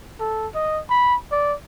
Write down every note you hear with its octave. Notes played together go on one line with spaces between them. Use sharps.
A4
D#5
B5
D5